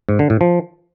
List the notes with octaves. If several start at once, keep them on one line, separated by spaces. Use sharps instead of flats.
G#2
D3
A2
F3